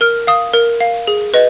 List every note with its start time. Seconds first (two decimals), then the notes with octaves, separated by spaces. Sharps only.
0.01 A#4 F6
0.27 F5 D#6
0.53 A#4
0.81 F5
1.07 G#4
1.34 B4 D#5